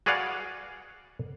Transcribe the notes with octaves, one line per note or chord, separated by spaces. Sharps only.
F#4 G#4 B4 D5 F5 F#5